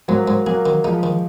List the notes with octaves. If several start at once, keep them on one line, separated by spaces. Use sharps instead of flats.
G#2 F#3 A#3
G#2
F#3 A#3 G#4
D#3
F3 G#3 D#4
D#3